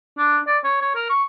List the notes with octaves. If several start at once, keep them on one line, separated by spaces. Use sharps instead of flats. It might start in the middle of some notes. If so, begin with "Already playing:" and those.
D4
D5
C#5
C#5
A#4
C#6